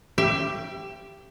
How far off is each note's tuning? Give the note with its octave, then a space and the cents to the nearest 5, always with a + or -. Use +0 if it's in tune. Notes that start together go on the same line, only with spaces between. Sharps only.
G4 +0 E5 +35